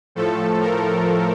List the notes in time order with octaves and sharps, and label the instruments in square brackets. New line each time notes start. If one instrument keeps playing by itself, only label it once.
[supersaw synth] A2 F3 A3 A4
A#4